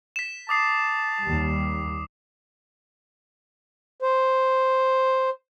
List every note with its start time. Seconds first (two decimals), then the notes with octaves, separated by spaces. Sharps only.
0.16 B6 E7
0.49 A5 D6 D#6 C7
1.25 D#2 G3
4.02 C5